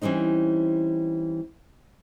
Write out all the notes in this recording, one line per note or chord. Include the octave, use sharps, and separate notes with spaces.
E3 G3 C4 C#4 D#4